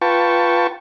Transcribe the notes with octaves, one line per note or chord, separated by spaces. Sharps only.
F4 B4 G5 A5 C#6